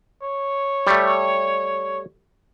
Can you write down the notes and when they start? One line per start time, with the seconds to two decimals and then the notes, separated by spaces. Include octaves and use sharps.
0.23 C#5
0.87 G3 A3